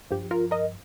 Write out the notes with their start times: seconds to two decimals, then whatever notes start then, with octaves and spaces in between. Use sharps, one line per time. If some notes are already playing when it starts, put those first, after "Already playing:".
0.11 G2 F3 G4
0.31 F4 A#4
0.51 A#4 D#5